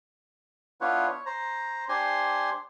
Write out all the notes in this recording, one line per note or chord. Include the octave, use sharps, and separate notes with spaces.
B3 D4 E4 F4 B4 C#5
C#5
C5 A#5
D4 G4 C5 G#5 C6